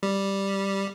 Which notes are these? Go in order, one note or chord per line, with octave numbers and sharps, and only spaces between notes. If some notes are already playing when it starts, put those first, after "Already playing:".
G3